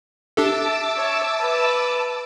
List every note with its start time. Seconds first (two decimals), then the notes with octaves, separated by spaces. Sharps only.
0.37 D4 G4 A4 E5 A5 D6 E6
0.97 C#5
1.40 B4